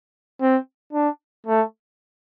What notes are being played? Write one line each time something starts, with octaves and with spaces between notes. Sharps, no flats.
C4
D4
A3